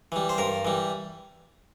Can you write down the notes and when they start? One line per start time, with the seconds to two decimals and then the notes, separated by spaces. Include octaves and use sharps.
0.12 E3 G3
0.29 C5
0.38 G2 A#4
0.65 E3 G3